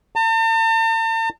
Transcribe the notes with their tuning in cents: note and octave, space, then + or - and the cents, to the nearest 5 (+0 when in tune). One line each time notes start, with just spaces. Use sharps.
A5 +45